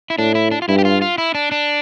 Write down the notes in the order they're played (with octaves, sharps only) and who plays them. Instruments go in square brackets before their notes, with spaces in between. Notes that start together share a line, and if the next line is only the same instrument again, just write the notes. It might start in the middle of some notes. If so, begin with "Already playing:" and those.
[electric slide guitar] E4
[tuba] A2 [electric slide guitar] D4
[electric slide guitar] E4
D4
F4
[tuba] G2 [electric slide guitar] E4
[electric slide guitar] G4
F4
F4
E4
D4
D4